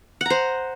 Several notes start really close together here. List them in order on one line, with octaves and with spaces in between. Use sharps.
F#5 A#5 C5